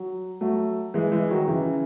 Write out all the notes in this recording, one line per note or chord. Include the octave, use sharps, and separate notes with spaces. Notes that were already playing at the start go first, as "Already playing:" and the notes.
Already playing: F#3
F#3 A3
E3 G#3
E3 G#3
D#3 F#3
C#3 E3